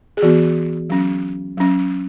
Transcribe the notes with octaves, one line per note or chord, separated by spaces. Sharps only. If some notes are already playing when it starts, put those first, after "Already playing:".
G#4
E3 B3 F#4
F#3 C#4
F#3 C#4